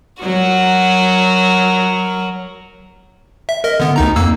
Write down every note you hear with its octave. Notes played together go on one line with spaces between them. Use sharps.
F#3 F#4 A#4
E5
A#4 D#5
D3 B3
D2 D#4 A#5
F2 A#3 E6